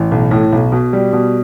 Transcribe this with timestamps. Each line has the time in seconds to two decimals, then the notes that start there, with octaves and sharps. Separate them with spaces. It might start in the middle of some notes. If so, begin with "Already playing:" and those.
Already playing: A1
0.12 B1
0.31 A2
0.52 B1
0.72 B2
0.93 G3
1.13 B2